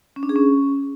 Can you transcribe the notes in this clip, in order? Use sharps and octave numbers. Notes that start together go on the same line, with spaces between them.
C#4
D4
G#4
C#4